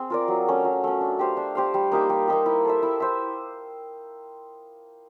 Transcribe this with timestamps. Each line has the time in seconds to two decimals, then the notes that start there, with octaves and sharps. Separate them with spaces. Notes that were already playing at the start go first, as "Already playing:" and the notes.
Already playing: C4 G#4
0.10 F4 A#4 D5
0.28 F#3
0.47 A3 C#4
0.65 F#3
0.84 A3 C#4
1.01 D4
1.19 G4 C5 F5
1.37 D4
1.55 G4 C5 F5
1.74 G3
1.92 A#3 D#4 G4
2.09 G3
2.28 A#3 D#4 G4
2.46 E4
2.65 A4 C5 E5
2.83 E4
3.00 C5 E5